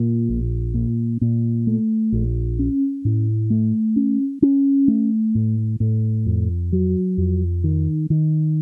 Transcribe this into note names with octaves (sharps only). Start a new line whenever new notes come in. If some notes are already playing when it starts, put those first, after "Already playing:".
Already playing: A#2
A#1
A#2
A#2
A3
A#1
C#4
A2
A3
C#4
C#4
A3
A2
A2
F2
F#3
F2
D#3
D#3